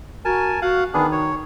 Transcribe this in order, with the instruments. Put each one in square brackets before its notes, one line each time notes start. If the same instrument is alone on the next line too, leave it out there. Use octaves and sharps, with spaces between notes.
[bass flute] F#4 [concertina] A#4 G#5 A5
[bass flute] F#4 [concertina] F5 F#5
[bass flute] D#3 [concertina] B3 D4 G#4
[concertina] C#5